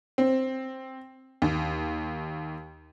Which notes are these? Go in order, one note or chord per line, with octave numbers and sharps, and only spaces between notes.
C4
D#2